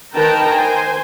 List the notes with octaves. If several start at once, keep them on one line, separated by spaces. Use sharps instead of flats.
D#3 A#4 B4 G5 A5 A#5
C5 G#5